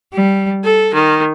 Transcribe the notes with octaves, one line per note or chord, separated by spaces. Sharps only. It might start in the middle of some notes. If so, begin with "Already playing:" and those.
G3
A4
D#3